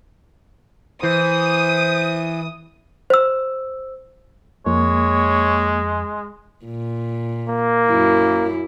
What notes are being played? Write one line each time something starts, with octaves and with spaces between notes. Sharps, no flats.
E3 C5 D#6
C5 E6
F2 G#3 A#3 C#5
A#2
A#3
F#2 E4